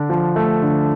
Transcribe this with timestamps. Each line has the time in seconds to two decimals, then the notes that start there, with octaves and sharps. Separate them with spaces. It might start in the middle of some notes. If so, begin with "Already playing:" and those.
Already playing: D3 D4
0.10 F3
0.36 A3
0.62 D3